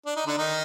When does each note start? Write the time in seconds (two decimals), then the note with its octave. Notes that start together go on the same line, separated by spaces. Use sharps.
0.06 D4
0.17 D#4
0.27 D3 D4
0.38 D#3 D#4